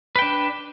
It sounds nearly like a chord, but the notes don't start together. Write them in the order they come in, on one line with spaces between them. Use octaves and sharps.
B4 G5 D4